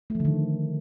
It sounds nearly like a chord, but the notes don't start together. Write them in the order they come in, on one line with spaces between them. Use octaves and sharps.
A3 F3 D3 D#3